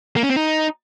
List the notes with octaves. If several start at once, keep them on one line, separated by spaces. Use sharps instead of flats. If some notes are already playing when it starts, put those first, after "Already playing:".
A#3
C#4
C4
D#4